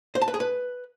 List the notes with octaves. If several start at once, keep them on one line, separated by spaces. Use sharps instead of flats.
C5
A5
B4
G#4
B4